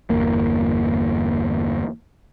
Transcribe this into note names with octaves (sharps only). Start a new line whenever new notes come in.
G1 E2 A#3